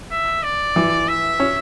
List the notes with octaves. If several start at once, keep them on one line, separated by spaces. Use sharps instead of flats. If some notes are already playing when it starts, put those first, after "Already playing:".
E5
D5
E3
E5
C#4